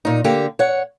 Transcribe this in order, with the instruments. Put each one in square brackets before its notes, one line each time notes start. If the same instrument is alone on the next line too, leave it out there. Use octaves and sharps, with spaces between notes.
[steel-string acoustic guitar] A#2 D#4
D3 A#3 G4
C#5 F#5